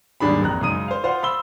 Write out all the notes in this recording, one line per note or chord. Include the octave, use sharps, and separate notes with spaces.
D#2 G#2 G3 D4 G#4 B5
A#1 F2 A#5 F#6
F#2 C#3 G#3 D#4 D#6 D#7
C5 F5
F4 C5 F5 F#5
B5 C6 E6 G7